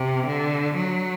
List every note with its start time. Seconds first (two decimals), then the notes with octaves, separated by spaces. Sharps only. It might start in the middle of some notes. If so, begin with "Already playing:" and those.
Already playing: C3
0.27 D3
0.75 F#3